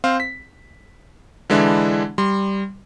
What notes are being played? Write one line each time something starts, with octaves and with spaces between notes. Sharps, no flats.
C4 C5 F5
B6
D3 E3 G#3 D4 E4
G3 C6